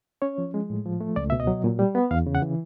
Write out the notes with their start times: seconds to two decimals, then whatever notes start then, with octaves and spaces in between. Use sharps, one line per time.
0.22 C#4 C#5
0.38 F3
0.54 G#3
0.70 A2
0.85 F3
1.01 A3
1.16 C#2 D5
1.30 B2 E5
1.40 D#5
1.47 F#3
1.64 A#2
1.79 G3
1.95 B3
2.11 E2 F5
2.27 C#3
2.35 F#5
2.42 E3